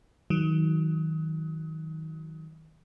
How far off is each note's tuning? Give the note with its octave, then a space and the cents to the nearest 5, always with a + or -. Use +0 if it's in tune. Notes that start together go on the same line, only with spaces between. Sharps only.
D#3 +30 F#3 +0